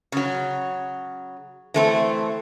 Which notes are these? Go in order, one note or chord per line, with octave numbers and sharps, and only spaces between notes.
C#3 F#3
E3 A3 C4